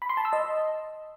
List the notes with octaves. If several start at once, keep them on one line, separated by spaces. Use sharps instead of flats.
B5
C6
A5
E6
D#5